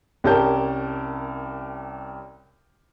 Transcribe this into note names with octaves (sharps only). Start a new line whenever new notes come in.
C2 C#4 G4 A#4 A5 G6